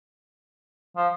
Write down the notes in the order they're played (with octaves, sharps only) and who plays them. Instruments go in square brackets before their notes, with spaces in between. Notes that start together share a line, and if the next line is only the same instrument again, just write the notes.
[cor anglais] F3